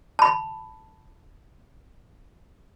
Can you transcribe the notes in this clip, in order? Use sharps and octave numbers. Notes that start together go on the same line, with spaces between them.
A5 B5